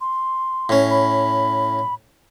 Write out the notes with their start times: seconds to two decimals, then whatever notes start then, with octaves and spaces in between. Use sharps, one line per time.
0.01 C6
0.69 A2 C#4
0.91 B5